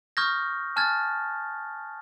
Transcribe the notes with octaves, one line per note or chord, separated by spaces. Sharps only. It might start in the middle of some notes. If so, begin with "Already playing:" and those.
C#6 D#6 F6 G6 G#6 A#6
G#5 A5 F6 F#6 G#6 A6